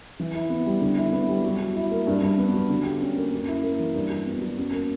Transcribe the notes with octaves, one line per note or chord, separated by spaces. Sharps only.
E3
E4
B3
G3
D3
E4
B3
G3
F#3
F#3
E4
A#3
G2
G2
B3
F#3
D3
G4
C#4
A#3
F#2
E4
A#3
E3
G2
F#4
B3
F#3
F#2
A#3